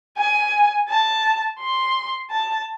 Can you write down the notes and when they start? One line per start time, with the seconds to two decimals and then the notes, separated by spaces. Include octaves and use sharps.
0.17 G#5
0.89 A5
1.60 C6
2.31 A5